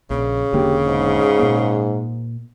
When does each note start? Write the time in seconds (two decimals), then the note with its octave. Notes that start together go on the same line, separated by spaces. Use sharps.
0.10 A#1 C#3
0.53 E1 D3 A#3 G4
0.86 G#2
1.39 A#2 A#3